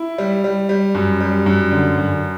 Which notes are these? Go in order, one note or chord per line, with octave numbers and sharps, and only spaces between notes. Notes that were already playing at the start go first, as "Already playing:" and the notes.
Already playing: E4
G3
G3
G3
F#2
G3
F#2
D3
F#2